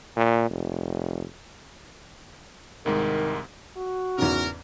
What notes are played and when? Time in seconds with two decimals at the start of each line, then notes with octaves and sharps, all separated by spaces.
0.16 A#2
0.50 F1
2.86 C2 G#2 D#3 G#3
3.77 F#4
4.18 E2 G#2 C#3 A#4